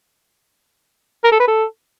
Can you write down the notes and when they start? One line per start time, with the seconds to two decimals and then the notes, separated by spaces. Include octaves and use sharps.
1.24 A#4
1.32 A4
1.40 B4
1.48 A4